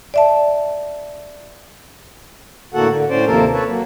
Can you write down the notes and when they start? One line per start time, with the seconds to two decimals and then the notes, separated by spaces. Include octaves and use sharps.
0.14 D5 E5 A5
2.74 A2 D3 A#3 F#4 A4 F#5
2.89 D3
3.10 A2 C#4 C5 D5
3.26 D#2 C3 F3 A#3 A4 A#4
3.53 A4 B4 C#5
3.67 F#3 A#3